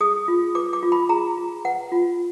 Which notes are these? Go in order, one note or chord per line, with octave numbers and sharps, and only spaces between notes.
G#4 D#6
F4
B4 D6
D6
F4
B5
G#4 A#5
F4
B4 F#5
F4